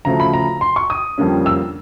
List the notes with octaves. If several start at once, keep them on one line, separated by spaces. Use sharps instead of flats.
D2 C#3 F3 A3 A#5
B5
A#5
C6
C#6
D#6
F2 D3 G3 A#3 C#4
E6